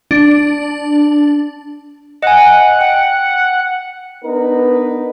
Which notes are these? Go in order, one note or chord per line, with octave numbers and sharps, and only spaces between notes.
D4
D#5 F#5 G#5
G5
B3 D4 D#4 A#4 B4